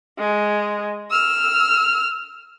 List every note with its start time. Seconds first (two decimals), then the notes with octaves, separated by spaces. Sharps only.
0.18 G#3
1.11 E6 F6